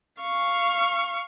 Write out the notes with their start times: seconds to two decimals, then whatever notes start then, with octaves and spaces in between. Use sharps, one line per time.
0.21 F5 C#6